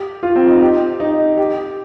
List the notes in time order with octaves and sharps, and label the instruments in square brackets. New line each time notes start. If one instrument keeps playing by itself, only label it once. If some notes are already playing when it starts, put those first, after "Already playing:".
Already playing: [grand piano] G4
F4
C4
D#4
G4
D#4
G4